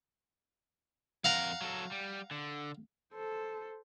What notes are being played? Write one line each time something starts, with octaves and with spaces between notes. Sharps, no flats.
F2 A#4 F5 F#5 A#5
F#3 A4
G3
D3
A4 C5